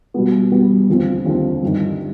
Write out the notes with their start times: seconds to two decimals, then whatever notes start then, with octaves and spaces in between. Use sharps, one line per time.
0.14 B2 G3 B3
0.52 B2 G3 B3
0.89 D#2 D3 F3 C4
1.25 D#2 D3 F3 C4
1.63 G1 G2 D#3